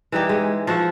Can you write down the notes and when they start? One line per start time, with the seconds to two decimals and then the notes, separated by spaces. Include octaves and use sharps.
0.12 E3 G3 D#4 G4
0.29 G#3
0.67 F3 F#4 E5 F#5